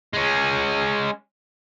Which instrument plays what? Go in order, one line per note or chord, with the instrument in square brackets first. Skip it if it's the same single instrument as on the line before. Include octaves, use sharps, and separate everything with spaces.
[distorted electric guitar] G#3 C#4